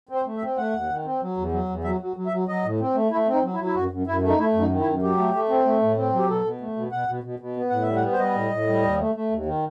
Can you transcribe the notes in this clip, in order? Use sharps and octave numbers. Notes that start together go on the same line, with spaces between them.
C4
C5
A3
E5
C4
A3 F#5
D#2
D#3
C4
F#3
E2
F#3
E2
F#3 E5
F#3
F#3
E5
F#3
F#3 D#5
A2
C4
A3
A3 E4
C4
D#4
F#3
E4
F#3
E4
F#2 F#4
F#2
F#2 E4
A3
D#4
A3 E4
F#2
D#4
D#3
E4
F#2
F#3 G4
A3
A3
C4
A3
A2
C4
F#3
G4
B2 A4
B2
A3
B2
B2 F#5
B2
B2
B2
B3
A2 F#5
E5
G3
F#5
B3
C5
G3 D#5
A2
A2
G3
D#2
A3
A3
D#2
D#3